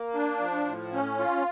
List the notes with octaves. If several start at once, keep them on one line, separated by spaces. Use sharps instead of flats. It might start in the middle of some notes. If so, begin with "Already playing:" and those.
Already playing: A#3
D4
F3
A2
C#4
F4